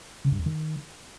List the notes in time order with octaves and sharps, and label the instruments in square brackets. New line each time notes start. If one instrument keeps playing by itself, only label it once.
[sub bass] C#3
G2
F2
D#3